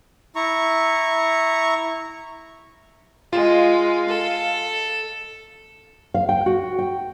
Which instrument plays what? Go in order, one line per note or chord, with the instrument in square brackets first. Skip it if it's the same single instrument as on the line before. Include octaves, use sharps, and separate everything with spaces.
[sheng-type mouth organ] E4 A#5 C#6
[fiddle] G#3 [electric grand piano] F4 [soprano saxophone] F5
[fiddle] A4
[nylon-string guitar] F5
G5
F#4
G5